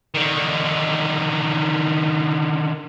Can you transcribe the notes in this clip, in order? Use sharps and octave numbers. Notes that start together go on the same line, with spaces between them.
D3 D#3